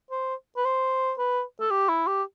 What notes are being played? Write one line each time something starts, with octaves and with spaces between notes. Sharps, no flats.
C5
B4
C5
B4
A4
G4
E4
G4